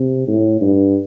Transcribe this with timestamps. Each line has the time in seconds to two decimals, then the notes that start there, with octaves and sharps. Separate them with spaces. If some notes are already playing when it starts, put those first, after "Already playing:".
Already playing: C3
0.27 A2
0.61 G2